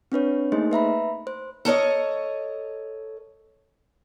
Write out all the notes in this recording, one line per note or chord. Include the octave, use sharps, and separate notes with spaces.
C4 D4 B4 C#5
A3 A#3 D#4 G#4 C5 D#5
B4 E5 A#5 B5
C5
A4 A#4 C#5 D#5